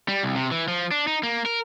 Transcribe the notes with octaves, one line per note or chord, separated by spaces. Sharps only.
G3
C2
C3
E3
F3
D4
D#4
A#3
A#4